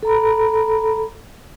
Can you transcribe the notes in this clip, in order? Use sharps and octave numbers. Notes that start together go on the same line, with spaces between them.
A4 A#5 B5